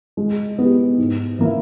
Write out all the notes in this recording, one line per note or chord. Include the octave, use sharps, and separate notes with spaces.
G#3
B3 G4
G#2
E3 A#3 E4